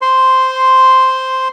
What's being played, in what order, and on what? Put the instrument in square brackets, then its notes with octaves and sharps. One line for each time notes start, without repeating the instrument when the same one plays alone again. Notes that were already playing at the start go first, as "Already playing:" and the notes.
[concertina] C5 C6